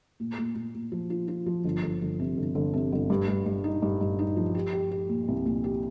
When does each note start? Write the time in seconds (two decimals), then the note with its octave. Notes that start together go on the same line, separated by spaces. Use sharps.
0.20 A#2
0.37 A#2
0.55 A#2
0.75 A#2
0.92 F3
1.10 F4
1.28 F4
1.46 F3
1.65 G1
1.83 G1
2.01 G1
2.19 C3
2.37 G1
2.55 G1
2.74 C3
2.92 G1
3.10 G2
3.28 G2
3.46 G2
3.64 D#4
3.82 G2
4.01 G2
4.19 D#4
4.37 F3
4.55 G4
4.73 G4
4.91 G4
5.09 A#2
5.28 C2
5.46 A#2
5.64 G4